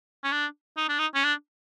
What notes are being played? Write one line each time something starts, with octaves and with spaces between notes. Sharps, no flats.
C#4
D4
D#4
D4
D#4
C#4
D4